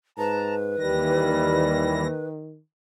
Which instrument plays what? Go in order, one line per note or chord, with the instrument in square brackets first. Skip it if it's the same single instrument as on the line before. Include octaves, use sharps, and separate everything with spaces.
[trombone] G#2 [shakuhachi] B4 [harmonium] A5 A#5
[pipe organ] D#2 E3 A#6 [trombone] D#3 [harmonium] G3